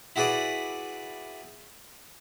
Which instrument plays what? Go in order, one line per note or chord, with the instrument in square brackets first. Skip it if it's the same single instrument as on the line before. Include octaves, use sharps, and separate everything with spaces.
[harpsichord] E4 F#4 G#4 B4 D5